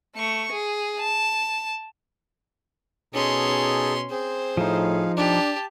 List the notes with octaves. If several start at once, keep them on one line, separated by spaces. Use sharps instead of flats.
A3 C#6
G#4
A5
B2 C#4 D#4 G#4 A4 C6
C4 G#4 C5
A2 F3 D#4 G#4 F5
D4 G4 A5